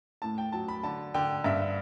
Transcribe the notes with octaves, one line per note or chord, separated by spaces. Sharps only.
A2 A5
G5
F#3 A5
B5
D3 A5
D3 G5
G2 E5